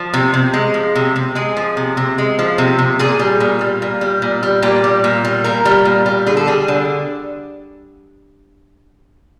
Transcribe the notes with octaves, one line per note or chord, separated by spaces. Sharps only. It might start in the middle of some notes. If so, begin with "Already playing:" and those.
Already playing: F3
C3
C3
G#3
F3
C3
C3
G#3 G#4
F3
C3
C3
G#3
F3
C3
C3
A#2 G#4
G3
A#2
G3
A#2
G3
A#2
G3
A#2 G4
G3
A#2
G3
A#2 A#4
G3
A#2
G3
D3 G#4
A4
G3 G#4
D3